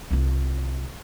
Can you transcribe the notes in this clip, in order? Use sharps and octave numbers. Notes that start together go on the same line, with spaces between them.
C2 F4